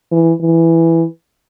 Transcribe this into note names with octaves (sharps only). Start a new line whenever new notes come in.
E3
E3